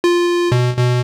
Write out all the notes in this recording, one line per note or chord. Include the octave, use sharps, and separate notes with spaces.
F4
B2
B2